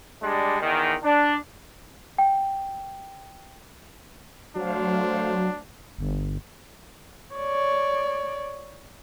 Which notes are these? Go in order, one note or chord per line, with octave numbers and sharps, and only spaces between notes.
G3 G#3 D4
E2 D#3
D4
G5
F#3 A3 D4 C5 F5
G1
C#5 D5